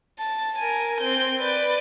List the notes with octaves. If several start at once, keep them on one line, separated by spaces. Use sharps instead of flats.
A5
A#4 G#5
C4 G6
B4 D5